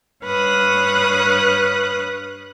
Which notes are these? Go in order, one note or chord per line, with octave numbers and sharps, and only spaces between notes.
G2 B4 C#5 F5 D#6 F#6